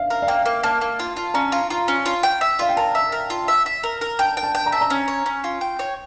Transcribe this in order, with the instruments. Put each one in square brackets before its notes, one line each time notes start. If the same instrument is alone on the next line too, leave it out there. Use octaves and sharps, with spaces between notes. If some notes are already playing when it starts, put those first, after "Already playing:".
Already playing: [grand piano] E5 F5
[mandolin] A#4
[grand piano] F5
[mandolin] A#3 [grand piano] G5
[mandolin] A#3
[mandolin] A#3 [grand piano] A5
[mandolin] A#3
F4
F4
[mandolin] C#4 [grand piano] A#5
[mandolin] F4
F4
C#4
F4
G5
E5
[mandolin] F4 [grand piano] F5
[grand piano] G5
[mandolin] A#4 [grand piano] A5
[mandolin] E5
A#4
F4
E5
E5
A#4
A#4
[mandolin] G5 [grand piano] A5
[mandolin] G5
[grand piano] A5
[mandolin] G5
[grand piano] A#5
[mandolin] E5 [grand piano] A5
[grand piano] A#5
[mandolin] C#4
C#5
C#4
F4
G5
C#5